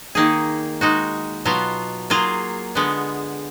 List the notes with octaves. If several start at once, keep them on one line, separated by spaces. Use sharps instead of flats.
D#3 A#3 D#4 G#4
G#3 D#4 F#4
B2 F#3 B3 F4
F#3 A#3 F4 G#4
D3 G#3 B3